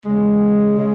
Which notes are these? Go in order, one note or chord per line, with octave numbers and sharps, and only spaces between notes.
E2 C#3 G#3
C#3 G#3